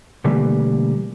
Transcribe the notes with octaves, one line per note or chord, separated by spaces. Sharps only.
B2 D3 E3 G3 A3 A#3